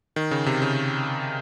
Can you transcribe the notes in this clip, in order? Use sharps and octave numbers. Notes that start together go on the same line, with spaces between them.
D#3
C#3
C3
C#3